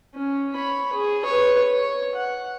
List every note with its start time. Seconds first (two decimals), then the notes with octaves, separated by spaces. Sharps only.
0.15 C#4
0.54 C#5 B5
0.93 G#4
1.25 B4 C#5
1.72 C#5
2.15 F#5